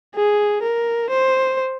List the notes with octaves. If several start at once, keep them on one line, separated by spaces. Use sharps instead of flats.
G#4
A#4
C5